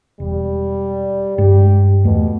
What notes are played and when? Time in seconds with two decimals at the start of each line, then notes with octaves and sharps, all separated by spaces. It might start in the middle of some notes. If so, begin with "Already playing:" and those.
0.20 E1 G3
1.38 G2 G#3 G4
2.04 E2 B2 A3